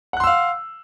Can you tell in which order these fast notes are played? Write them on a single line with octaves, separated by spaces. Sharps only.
F#5 F#6 C6 E6 F5